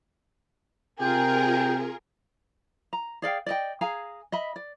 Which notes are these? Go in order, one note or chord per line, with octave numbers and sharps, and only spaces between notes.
C3 F4 G#4 A#4 G5
A#5
G#4 D5 F5 G5
D5 D#5 G5
G#4 F5 G#5 A#5
D#5 E5 B5
D5